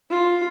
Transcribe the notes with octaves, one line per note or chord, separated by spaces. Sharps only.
F4